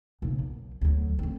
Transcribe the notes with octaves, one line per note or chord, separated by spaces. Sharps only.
B1 C#3
F#2
D2 F#3
D2 C4